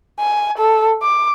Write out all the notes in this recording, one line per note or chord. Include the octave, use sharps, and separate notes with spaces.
G#5
A4
D6